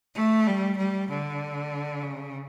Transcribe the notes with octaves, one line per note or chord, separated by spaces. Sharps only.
A3
G3
G3
D3
C#3